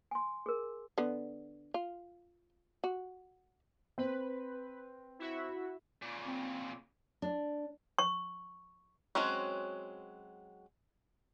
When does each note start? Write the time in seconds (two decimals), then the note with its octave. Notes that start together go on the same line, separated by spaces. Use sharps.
0.11 G#5 C6
0.46 G#4 A#4
0.98 D3 B3
1.74 F4
2.84 F#4
3.98 C4 B4
5.19 E4 F#4 E5
6.02 A#2 C#3
6.27 C4
7.22 D4
7.99 C#6
9.15 F#3 G#3 C4 C#4 F#4